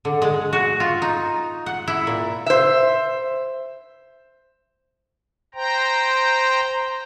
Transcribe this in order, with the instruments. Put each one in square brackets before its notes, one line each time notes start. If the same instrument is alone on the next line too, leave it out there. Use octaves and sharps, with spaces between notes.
[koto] D3
G#3
F#4
F4
D#4
F#5
E4
A#2
[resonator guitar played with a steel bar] C5 E5
[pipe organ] C5 G5 A#5